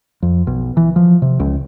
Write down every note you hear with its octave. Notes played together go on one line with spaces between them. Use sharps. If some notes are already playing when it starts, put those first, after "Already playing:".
F2
B1
E3
F3
C3
C#2